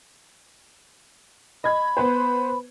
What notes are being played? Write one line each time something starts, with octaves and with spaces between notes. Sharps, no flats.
D#5 B5 G#6
B3 B4 C5